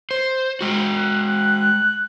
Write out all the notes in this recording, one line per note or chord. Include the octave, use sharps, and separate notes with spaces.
C5
G#3 F#4
F#6